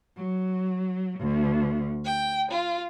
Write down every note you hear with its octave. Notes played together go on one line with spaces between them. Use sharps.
F#3
D2
G5
F4